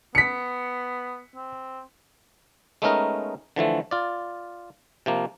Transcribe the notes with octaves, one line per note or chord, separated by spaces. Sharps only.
B3 B6 C#7
C4
G#3 A3 B3 C#4 D#4 A#4
D3 E3 F3 A3
F4 D5
C3 F3 A#3